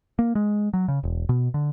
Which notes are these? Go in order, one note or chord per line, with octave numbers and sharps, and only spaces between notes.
A#3
G#3
F#3
C#3
E1
B2
D3